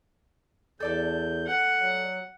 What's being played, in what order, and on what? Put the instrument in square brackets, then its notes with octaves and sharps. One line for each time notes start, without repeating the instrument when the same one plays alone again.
[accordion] E2 G6 [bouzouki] A4 D5 A5
[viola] F#5
[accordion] F#3